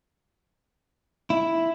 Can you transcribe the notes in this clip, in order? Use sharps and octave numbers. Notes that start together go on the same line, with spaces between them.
E4